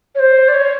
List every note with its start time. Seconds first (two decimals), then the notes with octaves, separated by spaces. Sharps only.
0.15 C#5
0.20 C5
0.49 D5
0.54 C#5